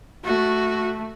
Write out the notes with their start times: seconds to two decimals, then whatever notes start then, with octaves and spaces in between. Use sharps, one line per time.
0.24 A3 F#4